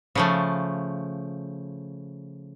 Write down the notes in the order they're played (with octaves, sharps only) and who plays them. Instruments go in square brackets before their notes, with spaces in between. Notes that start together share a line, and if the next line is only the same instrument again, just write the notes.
[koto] C#3 F3 A3